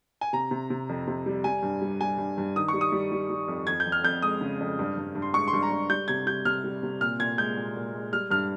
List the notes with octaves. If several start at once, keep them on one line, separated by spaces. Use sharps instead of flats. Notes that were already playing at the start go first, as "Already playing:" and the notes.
G#5
C3 A#5
C3
C3
F2
C3
G3
G3 G#5
G2
G3
G3 G#5
G2
G2
D#3 D#6
C#6
G3
D#6
G3
G3
G3
F2
F2 G#6
G6
F2
F6
F2 G6
G#3 D#6
C#3
F2
G2
G2
G2
C6
G#3 C#6
C6
G2
A#5
G2
G3 G6
C3 G#6
G3 G6
C3 F6
G3
C3
A#2 F6
A#2 G#6
G#3 G6
A#2
A#2
G#3
G3 F6
G2 F6